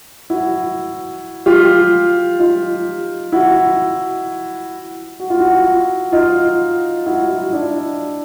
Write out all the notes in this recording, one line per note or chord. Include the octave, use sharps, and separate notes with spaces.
E4 F#4
F4 G4
D#4 F4
E4 F#4
F#4
F4
E4 F#4
D#4 F4
E4 F#4
E4 F#4
D4 E4